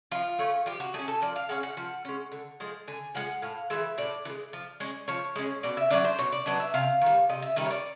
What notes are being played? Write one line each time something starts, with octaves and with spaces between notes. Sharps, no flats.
F3 F4
A3 C#4
F3 G4
F#4
A3 C#4 G#4
A4
F3 D5
F5
G#3 C#4 F#5
F#5
F3
G#3 C#4
D3
F3 G#3
D3 G#5
F3 G#3 F#5
A2 F5
E3 G#3 E5
A2 D5
E3
G#3
F3
G#3 C#4
F3 C#5
G#3 C#4
B2 D5
E5
F#3 B3 D4 D5
C5
B2 C#5
D5
F#3 B3 D4 D#5
E5
C3 F5
D#3 G3
C3 D#5
E5
D#3 G3 D#5
C#5
D5